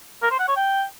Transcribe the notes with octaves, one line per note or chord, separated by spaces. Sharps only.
A#4
C5
F#5
C#5
G5